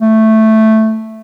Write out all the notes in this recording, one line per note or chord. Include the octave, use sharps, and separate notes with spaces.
A3